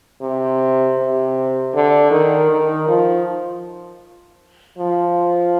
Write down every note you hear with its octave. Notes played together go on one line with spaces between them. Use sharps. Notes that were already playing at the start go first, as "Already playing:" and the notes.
C3
C3
D3
D#3
D#3
F3
F3